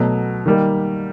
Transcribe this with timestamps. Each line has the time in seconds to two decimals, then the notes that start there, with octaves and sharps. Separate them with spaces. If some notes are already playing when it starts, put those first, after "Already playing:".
Already playing: B2 F#3 A3
0.46 D#3 G3 A#3